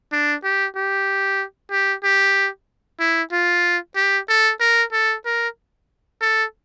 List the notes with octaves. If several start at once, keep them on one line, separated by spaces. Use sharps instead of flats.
D4
G4
G4
G4
G4
E4
F4
G4
A4
A#4
A4
A#4
A4